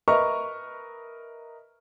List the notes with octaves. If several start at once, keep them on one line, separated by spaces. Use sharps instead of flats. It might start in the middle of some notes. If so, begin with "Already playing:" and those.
A#4 B4 D#5 E5 C#6 F6